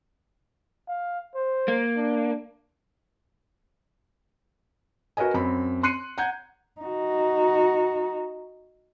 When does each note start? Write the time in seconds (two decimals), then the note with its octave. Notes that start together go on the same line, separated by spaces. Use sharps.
0.88 F5
1.35 C5
1.68 A#3
1.97 D4
5.17 F#4 A#4 B4 D#5 G#5
5.34 F#2 C4 B5
5.83 C6 F#6 C7 C#7 D#7
6.18 F#5 A#5 G6 G#6
6.81 D#4 F#4